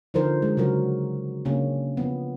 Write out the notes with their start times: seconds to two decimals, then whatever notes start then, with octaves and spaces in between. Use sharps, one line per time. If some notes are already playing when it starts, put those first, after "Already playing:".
0.14 D3 F3 D#4 A#4 C5
0.42 G#3
0.57 C#3 F#3 F#4 A#4
1.45 C#3 A#3 C#4 D4
1.97 F3 B3